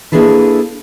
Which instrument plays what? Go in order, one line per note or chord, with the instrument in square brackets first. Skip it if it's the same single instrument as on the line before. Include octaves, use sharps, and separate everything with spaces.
[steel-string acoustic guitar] A#3 D4 E4 G#4 A4 B4